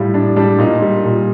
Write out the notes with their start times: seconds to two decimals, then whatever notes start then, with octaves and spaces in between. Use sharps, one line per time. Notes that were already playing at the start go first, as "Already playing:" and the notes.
Already playing: A2 G3 F4
0.14 A2 D4
0.36 G3 D4
0.59 A#2 D#4
0.82 G3
1.05 A#2